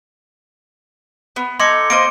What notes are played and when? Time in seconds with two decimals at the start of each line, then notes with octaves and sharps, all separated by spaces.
1.36 B3
1.60 D#4 A4 G#5 C6 D6 C#7
1.90 A#3 C5 D#5 D7